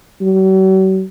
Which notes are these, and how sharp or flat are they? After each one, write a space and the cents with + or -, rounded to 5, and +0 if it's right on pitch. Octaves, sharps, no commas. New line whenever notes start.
F#3 +45